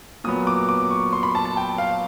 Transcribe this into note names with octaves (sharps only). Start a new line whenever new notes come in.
A#2 F#3 B3 D#6
D6
D6
C#6
C6
B5
A5
A5
G5
F5